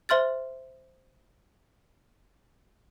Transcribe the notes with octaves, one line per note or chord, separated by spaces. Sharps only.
C5 E5 C6 F6 A6